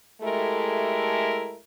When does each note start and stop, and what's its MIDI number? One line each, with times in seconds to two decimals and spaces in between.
0.21 1.57 56
0.21 1.57 57
0.21 1.57 64
0.21 1.57 67
0.21 1.57 69
0.21 1.57 70